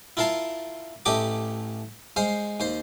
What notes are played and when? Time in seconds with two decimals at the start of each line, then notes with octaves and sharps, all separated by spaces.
0.17 E4 F4 A#4 F5 A5
1.06 A1 A3 G4 D#5 D6
2.16 G#3 C5 F5
2.60 D#2 C5